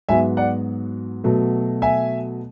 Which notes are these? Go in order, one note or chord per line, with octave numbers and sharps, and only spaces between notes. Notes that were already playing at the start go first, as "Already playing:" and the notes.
G#2 F#3 B3 E5 G#5
D5 F#5
B2 F#3 A3
E5 G#5